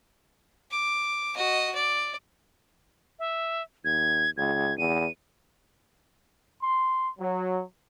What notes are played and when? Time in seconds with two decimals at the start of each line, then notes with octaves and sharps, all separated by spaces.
0.71 D6
1.36 F#4 D#5
1.74 D5
3.19 E5
3.85 D#2 G#6
4.37 C#2 G#6
4.78 E2 D#7
6.60 C6
7.18 F#3